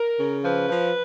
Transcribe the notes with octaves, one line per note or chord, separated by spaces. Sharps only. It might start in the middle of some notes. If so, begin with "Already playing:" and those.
Already playing: A#4
C#3
F3 B4
F3